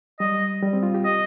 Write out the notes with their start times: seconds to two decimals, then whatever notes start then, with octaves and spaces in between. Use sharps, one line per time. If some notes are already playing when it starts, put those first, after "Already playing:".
0.20 G3 D#5
0.62 G3
0.73 C4
0.83 F4
0.94 G4
1.05 D#5